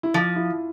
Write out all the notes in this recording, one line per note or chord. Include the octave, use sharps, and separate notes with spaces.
E4
F3 F4
E4